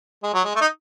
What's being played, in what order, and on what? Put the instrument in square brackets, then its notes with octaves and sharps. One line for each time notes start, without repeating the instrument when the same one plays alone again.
[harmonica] G#3
F#3
G#3
A3
D#4